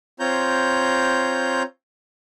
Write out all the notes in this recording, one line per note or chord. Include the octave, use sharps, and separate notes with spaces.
C4 F4 C#5 A#5 G6